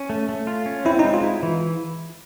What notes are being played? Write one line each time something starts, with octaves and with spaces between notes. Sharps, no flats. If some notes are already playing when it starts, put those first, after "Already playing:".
Already playing: C#4
A3
A3
F4
C#4
C4 E4
D#4
G#3
F4
E4
E3